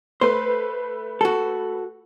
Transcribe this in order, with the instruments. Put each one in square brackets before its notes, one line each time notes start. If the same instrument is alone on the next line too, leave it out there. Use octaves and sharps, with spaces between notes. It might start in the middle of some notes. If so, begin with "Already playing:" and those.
[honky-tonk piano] A3 B4 [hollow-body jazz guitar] C5
[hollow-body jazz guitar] F#4 A4